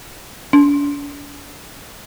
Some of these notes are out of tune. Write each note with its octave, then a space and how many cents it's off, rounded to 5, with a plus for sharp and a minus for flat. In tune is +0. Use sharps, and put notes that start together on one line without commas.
D4 -45